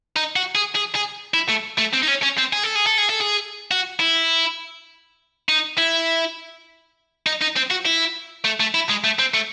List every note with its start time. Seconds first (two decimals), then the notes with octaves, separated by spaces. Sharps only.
0.16 D#4
0.36 F#4
0.55 G#4
0.75 G#4
0.95 G#4
1.34 E4
1.49 A3
1.78 A3
1.94 C4
2.03 D#4
2.08 C#4
2.23 C#4
2.38 C4
2.53 G#4
2.64 A4
2.75 G#4
2.86 A4
2.98 G#4
3.09 A4
3.21 G#4
3.71 F#4
4.00 E4
5.49 D#4
5.78 E4
7.26 D#4
7.41 D#4
7.56 C4
7.70 F#4
7.85 E4
8.44 A3
8.60 A3
8.74 E4
8.89 G#3
9.04 A3
9.19 C4
9.34 A3